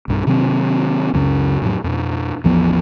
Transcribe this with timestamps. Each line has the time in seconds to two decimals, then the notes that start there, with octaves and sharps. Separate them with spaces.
0.08 B1 G2
0.27 C3 D#3 F#3 C4
1.13 C#2 F#2 C#3
1.62 F2 A2 F#3
1.84 F2 B2
2.44 A1 E2 F3 B3